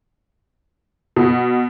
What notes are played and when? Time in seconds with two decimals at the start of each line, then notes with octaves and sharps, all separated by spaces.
1.16 B2